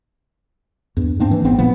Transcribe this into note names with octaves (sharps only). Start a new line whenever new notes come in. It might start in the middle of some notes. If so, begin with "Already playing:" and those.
E2 G2
G#2 A#3 C4 D4
E3
G#1 G#2 B3 C4
A#2 F3 A#3 B3